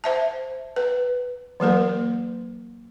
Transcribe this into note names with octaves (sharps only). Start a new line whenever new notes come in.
C5 E5 A5
B4
E3 F#3 A#3 A#4